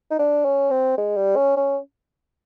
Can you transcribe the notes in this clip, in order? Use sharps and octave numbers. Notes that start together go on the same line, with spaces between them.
D#4
D4
C#4
C4
G#3
G3
C#4
C#4